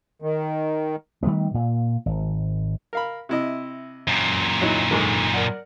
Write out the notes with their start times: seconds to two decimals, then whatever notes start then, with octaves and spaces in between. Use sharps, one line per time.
0.22 D#3
1.23 D#3 G3 A3 B3
1.54 A#2
2.06 G#1
2.93 A#4 F5 B5
3.29 C3 E4 D#5
4.07 F#2 A#2
4.62 F#3 D#4 E4
4.91 G#2 D3 D#3
5.34 A#4 D5 F#5